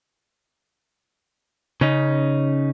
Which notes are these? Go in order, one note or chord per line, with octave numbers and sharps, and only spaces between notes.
C#3 C#4 D#4